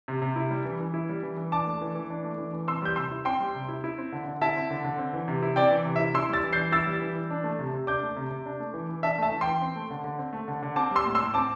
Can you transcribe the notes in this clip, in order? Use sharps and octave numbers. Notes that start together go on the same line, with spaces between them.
C3
C3
E4
G3
E3
E3
E4
G3
E3
E3
D4 A5 D6
A3
E3
E3
D4
A3
E3
E3
C4 C6 E6
G3 G6
C3 C6 E6
E4
C4 G5 C6
G3
C3
E4
E4
C4
D3
D3
E4 E5 A5
C4
D3
D3
C4
E3
C3
E4
C4 D5 G5
E3
C3
E5
E4
E4 C6 E6
G3 E6 A6
E3
G6 C7
E3
E4 E6 A6
G3
E3
E3
D4
A3
C3
C3
D4 D6 G6
A3
C3
C3
D4
A3
E3
E3
D4 E5 A5
A3 E5 A5
E3
G5 C6
E3
C4
A3
D3
D3
C4
A3
D3
D3
C4 A5 D6
G3 C6 E6
A2
C6 E6
A2
C4 A5 D6